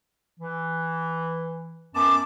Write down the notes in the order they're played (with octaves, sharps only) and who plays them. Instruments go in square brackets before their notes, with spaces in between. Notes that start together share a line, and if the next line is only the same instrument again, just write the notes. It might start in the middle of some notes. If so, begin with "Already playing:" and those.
[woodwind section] E3
[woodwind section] F#2 B3 A5 [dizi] D6